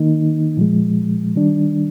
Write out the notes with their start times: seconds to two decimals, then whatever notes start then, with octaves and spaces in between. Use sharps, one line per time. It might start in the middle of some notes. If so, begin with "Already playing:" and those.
Already playing: D#3 A#3 D#4
0.57 A#2 F3 G#3
1.36 D#3 G3 D4